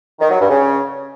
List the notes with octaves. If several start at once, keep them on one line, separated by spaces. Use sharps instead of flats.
D#3
F#3
G2
C#3